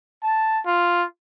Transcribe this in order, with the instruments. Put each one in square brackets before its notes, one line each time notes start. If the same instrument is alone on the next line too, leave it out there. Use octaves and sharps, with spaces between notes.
[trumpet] A5
F4